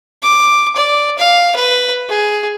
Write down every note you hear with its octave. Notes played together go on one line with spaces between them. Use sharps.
D6
D5
F5
B4
G#4